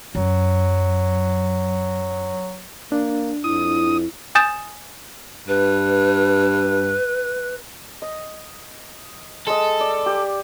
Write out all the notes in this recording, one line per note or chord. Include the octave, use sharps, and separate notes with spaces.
F#2 F#3
A#3 D4
F2 E4 D#6
G#5 D#6 G6 A6 E7
G2 B4
D#5
G#3 A4 D#5
D5
G4